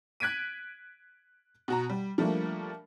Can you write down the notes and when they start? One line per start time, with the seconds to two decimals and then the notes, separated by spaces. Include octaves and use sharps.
0.20 F#6 G#6 B6 D7 D#7
1.68 B2 F#4 A#5
1.89 G3
2.18 F3 G3 A3 A#3 D4